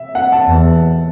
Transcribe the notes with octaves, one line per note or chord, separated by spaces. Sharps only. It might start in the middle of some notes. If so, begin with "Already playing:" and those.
Already playing: E5
F#5
A5
E2